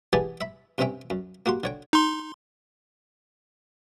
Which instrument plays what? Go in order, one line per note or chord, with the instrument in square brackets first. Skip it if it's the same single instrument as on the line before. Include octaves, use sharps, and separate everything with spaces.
[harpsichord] E3 B3 G4 G#4 D5 A5
E5 B5
G2 C3 C4 C#4 E5 G5
F#2
A#3 F#4 G4 C6
D3 C#5 G5
[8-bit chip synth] D#4 C6